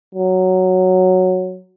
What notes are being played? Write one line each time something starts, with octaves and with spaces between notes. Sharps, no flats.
F#3